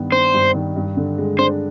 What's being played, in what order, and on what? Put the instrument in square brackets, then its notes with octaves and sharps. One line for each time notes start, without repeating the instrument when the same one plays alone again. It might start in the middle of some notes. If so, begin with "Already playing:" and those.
Already playing: [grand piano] G2 D#3 B3
[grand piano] D4 [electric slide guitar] C5
[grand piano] G2
D#3
G2
D3
G#3
[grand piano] D4 [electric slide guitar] C5